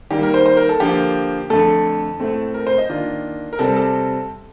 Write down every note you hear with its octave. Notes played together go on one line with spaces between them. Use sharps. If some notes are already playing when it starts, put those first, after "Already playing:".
D#3 G3 A#3 D#4 G4
A#4
C5
C5
A#4
A4
D3 F3 A#3 F4 G4
F2 D3 A3 A4
A2 A3 C4
A#4
C5
D#5
D#3 A#3 D4 F4
A#4
C3 G3 C4 A4
A4